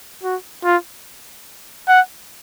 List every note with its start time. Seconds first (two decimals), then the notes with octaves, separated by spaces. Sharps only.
0.23 F#4
0.64 F4
1.88 F#5